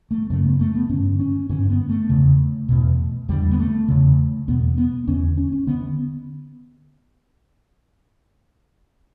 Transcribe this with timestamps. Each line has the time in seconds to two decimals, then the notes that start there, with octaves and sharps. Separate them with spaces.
0.11 A3
0.30 F#2 C#3 A3
0.46 B3
0.60 A3
0.75 B3
0.89 G2 D3 C#4
1.19 C#4
1.49 G2 D3 C#4
1.70 B3
1.89 A3
2.10 E2 C#3
2.69 E2 B2
3.29 E2 D3 G3
3.51 B3
3.59 A3
3.88 E2 C#3
4.48 E2 B2 B3
4.78 B3
5.07 E2 D3 C#4
5.37 C#4
5.52 C#4
5.67 D3 B3